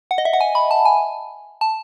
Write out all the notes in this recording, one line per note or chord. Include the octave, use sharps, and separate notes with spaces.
F#5
D#5
E5
F#5
G#5
B5
A5
G#5
A5